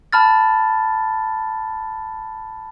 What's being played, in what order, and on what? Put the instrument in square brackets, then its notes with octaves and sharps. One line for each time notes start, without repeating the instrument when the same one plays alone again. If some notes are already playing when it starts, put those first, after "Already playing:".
[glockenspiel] A5 B5 F6 A6